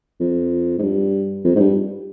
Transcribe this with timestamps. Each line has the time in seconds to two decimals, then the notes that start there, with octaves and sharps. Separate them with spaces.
0.20 F2
0.78 G#2
0.82 G2
1.44 F2
1.55 G#2
1.59 G2